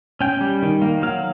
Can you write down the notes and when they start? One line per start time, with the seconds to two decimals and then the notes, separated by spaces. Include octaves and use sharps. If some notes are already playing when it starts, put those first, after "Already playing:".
0.21 C#4 G5
0.41 G3
0.62 D#3
0.82 A#3
1.02 F#3 F5